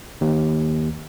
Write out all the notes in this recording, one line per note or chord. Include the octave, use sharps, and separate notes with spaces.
D#2